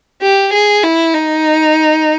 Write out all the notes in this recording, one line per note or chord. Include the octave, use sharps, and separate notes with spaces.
G4
G#4
E4
D#4